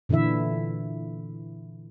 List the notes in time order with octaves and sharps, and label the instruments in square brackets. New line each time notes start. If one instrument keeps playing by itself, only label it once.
[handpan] A#2 D3 E3 E4 E5